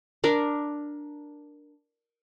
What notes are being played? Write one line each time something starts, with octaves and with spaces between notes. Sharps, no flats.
D4 A#4